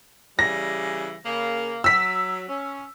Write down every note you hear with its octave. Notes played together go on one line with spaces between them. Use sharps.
C#3 E3 G3 A#6
C#3 A#3
F#3 E6 B6
C#4